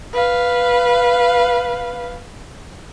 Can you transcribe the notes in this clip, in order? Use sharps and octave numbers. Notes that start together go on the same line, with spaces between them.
B4 F5